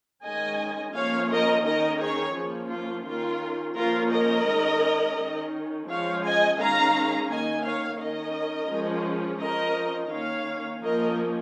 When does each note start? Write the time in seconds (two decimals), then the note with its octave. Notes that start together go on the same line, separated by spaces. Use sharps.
0.24 D#3 G#3 C#4 D#5 G#5
0.95 F3 A#3 C#4 C#5 F5
1.31 A#4 D#5
1.66 D#3 C#4 A#4 D#5
2.01 G#4 C#5
2.36 F3 A#3 C#4
2.71 F4
3.07 D#3 C#4 F4 A#4
3.77 F3 A#3 C#4 F4 A#4
4.12 A#4 D#5
4.48 D#3 G#3 C#4
5.18 D#3 C#4
5.89 F3 G#3 C#4 C#5 F5
6.24 D#5 G#5
6.59 D#3 G#3 C#4 F5 A#5
7.30 D#3 A#3 C#4 D#5 G#5
7.65 C#5 F5
8.00 D#3 C#4 A#4 D#5
8.71 F3 G#3 C#4
9.41 F3 C#4 A#4 D#5
10.12 D#3 A#3 C#4 C#5 F5
10.82 F3 A#3 C#4 A#4 D#5